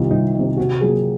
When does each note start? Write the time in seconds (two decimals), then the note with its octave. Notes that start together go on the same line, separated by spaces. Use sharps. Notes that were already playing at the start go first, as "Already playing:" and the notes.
Already playing: C2 C3 D#3 F4
0.11 C2 D#4
0.35 C3 D#3
0.57 C3 F#4
0.81 F#3 A#3 F4 G#4